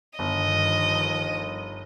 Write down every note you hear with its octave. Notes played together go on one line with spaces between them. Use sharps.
G1 G2 D#3 F3 D#5